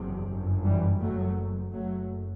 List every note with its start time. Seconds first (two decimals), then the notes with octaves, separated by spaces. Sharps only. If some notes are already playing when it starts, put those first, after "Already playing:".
Already playing: F#1 E2 C3
0.29 G1 F#2
0.64 E3 G3
1.00 F#1 F#2 F#3 A3
1.72 F#1 F#2 F#3 A3